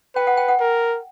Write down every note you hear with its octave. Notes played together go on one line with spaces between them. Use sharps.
B4 G5
F#5
G5
F#5
A#4